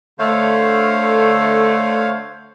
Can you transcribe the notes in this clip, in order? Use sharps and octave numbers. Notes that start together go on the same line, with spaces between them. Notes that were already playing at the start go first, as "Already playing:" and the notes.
D3 A3 C5 C#5 F5